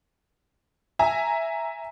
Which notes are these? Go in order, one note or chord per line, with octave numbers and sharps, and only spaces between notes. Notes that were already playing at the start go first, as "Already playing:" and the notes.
E5 G#5 A#5